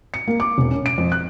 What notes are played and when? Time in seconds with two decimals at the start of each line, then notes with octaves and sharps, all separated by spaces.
0.14 C#7
0.27 A#3
0.40 D6
0.58 E1
0.71 C#4
0.86 D7
0.98 F2
1.12 F#6